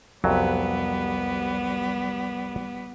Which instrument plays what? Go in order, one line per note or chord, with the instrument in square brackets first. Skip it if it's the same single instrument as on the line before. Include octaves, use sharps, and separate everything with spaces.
[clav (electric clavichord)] C2 F2 F#3 [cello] G3 B3